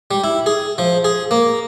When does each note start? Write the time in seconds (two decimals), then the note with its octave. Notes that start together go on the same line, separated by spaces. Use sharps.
0.11 G3
0.24 E4
0.46 G#4
0.78 F3
1.04 G#4
1.31 A#3